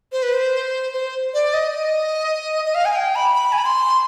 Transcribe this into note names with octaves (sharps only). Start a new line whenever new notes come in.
C5
B4
C5
C5
D5
D#5
D#5
F5
G#5
G5
B5
B5
G#5
B5
C6